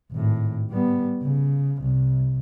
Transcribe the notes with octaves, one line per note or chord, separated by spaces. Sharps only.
G#1 A2
G3 B3
C#3
C2